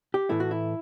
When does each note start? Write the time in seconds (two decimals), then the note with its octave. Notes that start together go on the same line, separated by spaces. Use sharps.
0.14 G4
0.29 A2 E3 A3 E4
0.40 F#4
0.51 E4